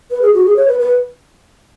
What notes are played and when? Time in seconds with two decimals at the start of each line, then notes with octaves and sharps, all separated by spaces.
0.11 B4
0.22 G#4
0.34 F#4
0.45 G#4
0.56 C#5
0.68 B4
0.79 B4